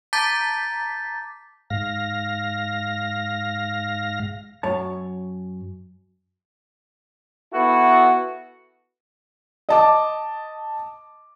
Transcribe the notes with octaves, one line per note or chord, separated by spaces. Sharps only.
A5 A#5 D6 G6 A6 B6
G#2 F5 A#6
F#2 C#5 A5
B3 E4 F#4 A4
D#5 A5 D6